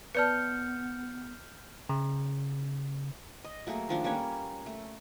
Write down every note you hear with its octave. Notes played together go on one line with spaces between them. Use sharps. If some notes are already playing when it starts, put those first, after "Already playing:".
B3 B4 D5 A5 F6 G6 C#7
C#3
D#5
F#3 A3 A#3 G#4
D#3 F3 D4
G3 A#3 C#4 C#5
A3